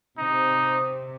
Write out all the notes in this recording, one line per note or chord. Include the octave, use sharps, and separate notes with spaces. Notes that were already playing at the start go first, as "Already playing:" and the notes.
C3 D#4